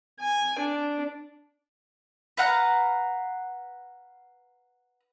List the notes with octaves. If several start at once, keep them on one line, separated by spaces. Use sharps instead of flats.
G#5
D4
B4 F5 F#5 A#5